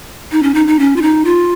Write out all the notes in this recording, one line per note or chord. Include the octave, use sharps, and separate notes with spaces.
D#4
C#4
D#4
D#4
C#4
F4
D#4
F4